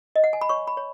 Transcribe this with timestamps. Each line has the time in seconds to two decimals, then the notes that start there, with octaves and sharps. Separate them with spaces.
0.16 D#5
0.24 F#5
0.33 G#5
0.41 B5
0.49 C#5 C#6
0.67 B5
0.77 C#5